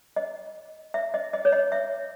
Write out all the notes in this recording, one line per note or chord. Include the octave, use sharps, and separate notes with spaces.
D#5
E5
D#5
D#5
C#5
D#5
E5